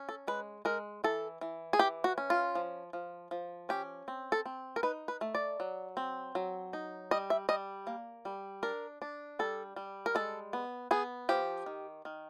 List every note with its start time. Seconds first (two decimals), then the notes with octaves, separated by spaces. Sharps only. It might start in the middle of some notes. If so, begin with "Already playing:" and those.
Already playing: C#4
0.09 A4
0.28 G#3 B4
0.65 G#3 A#4
1.04 E3 A4
1.41 E3
1.73 G#4
1.79 E3 G4
2.04 F#4
2.18 C#4
2.30 F4
2.55 F3
2.93 F3
3.31 F3
3.69 C#4 G4
4.08 C4
4.32 A4
4.46 C4
4.76 A#4
4.83 D#4 B4
5.08 B4
5.21 A3
5.35 D5
5.60 F#3
5.97 C4
6.35 F#3
6.73 D#4
7.11 G3 D#5
7.30 E5
7.49 G3 D#5
7.87 A#3
8.25 G3
8.63 D4 A#4
9.02 D4
9.39 G3 A4
9.76 G3
10.06 A#4
10.15 G#3 A4
10.53 B3
10.91 B3 G#4
11.29 F3 G4
11.66 D#3
12.05 D#3